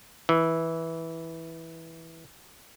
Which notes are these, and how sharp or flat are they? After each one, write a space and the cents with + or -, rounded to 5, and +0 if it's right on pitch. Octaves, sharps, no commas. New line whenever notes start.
E3 -10